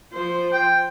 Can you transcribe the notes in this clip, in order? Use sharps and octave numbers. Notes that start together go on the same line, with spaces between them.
F3 C5
G5